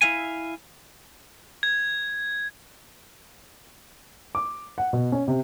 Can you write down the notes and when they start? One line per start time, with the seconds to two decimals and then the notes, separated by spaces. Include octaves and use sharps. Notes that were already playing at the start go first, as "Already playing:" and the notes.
0.02 E4 E5 F5 G#5
1.63 G#6
4.35 D6
4.78 F#5
4.93 B2
5.12 C#4
5.28 C3